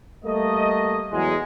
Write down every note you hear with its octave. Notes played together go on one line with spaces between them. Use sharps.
G3 A3 A#3 D#5
E2 F#3 G#3